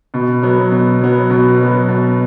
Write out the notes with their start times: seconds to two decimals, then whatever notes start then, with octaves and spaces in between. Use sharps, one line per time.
0.14 B2
0.43 F#3 B3
0.71 B2
1.01 F#3 B3
1.30 B2
1.59 F#3 B3
1.88 B2